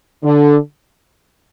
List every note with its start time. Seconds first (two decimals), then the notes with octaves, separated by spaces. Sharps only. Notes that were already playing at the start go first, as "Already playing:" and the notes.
0.24 D3